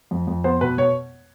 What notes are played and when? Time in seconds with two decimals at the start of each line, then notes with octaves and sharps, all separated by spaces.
0.11 F2
0.27 F2
0.44 B3 C5
0.61 B2 B4
0.78 B2 C#5